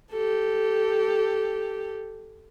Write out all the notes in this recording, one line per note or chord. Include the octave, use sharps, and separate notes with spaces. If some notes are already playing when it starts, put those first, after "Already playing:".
G4 A4